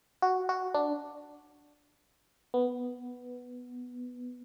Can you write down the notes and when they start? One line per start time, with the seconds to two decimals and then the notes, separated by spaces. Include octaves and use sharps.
0.22 F#4
0.49 F#4
0.74 D4
2.54 B3